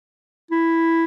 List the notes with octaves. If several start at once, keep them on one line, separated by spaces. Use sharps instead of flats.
E4